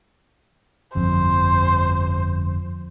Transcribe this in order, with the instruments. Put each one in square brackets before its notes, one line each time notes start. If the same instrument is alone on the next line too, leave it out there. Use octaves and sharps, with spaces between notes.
[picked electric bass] G1 F2 [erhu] C5